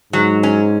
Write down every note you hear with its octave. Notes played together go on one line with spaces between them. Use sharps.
G#2 F#3
C#4